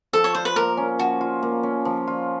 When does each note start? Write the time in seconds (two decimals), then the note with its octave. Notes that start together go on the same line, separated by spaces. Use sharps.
0.13 F3 A4
0.24 C#5
0.35 F4 C5
0.45 B4
0.56 A#3 A#4
0.77 C#4
0.99 F3 F#4
1.21 F4
1.43 A#3
1.63 C#4
1.85 F3
2.08 F4